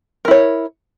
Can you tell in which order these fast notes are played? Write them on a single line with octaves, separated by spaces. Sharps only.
A#4 E4 C#5